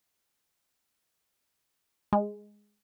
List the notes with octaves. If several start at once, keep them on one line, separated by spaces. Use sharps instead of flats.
G#3